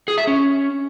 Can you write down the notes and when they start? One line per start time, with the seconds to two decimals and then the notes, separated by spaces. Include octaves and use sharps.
0.08 G#4
0.18 E5
0.27 C#4